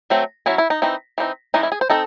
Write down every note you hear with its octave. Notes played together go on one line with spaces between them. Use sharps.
F#3 A3 C4
F#3 C#4 E4
E4
D#4
E3 C4 D#4
E3 C4 D#4
E3 G#3 C#4 D#4
E4
G#4
C5
C4 D#4 A4